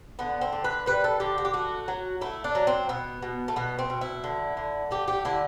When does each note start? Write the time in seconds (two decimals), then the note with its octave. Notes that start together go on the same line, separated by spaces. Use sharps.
0.19 D3 B3
0.41 C4
0.52 D3
0.64 B4
0.86 G3 B4
1.04 A4
1.20 D3 G4
1.38 F#4
1.45 G4
1.53 A3 F#4
1.88 F#3
2.21 A3 E4
2.44 D4
2.55 F#3
2.67 C4
2.89 B2 B3
3.23 B2
3.48 A3
3.56 B2 B3
3.79 C4
3.90 B2
4.01 E4
4.24 D3
4.57 D3
4.91 A3 G4
5.08 G4
5.25 D3 E4